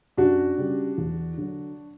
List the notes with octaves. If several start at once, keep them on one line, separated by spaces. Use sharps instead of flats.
F#2 D4 F#4
C#3 G3
E2
D3 F#3